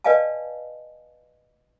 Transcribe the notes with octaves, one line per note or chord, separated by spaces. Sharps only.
B4 D5 D#5 F5 G#5 A5